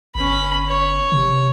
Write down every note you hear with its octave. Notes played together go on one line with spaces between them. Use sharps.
G1 C#4 B5
C#5
C3